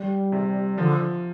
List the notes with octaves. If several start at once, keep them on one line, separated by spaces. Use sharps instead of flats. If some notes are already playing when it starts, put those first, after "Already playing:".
Already playing: G3
C3
D3 F3